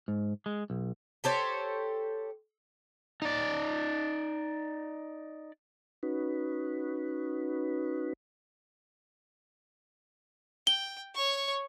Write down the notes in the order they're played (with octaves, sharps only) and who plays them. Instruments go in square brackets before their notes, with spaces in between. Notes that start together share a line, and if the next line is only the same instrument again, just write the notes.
[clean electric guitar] G#2
G#3
B1
[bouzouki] G4 A4 C5 C#5
[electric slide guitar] D#4 D5
[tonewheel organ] C#4 D#4 F#4 B4
[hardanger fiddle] G5 [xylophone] G7
[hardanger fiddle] C#5 C#6